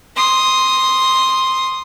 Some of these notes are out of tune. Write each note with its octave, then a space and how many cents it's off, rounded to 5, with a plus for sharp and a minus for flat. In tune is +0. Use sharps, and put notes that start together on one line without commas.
C6 +5 D#6 +0